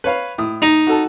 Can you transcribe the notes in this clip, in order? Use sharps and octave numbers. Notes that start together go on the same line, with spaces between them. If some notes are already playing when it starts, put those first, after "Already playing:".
B4 C#5 F5
A2 D#6
D#4
F#4 A4 A5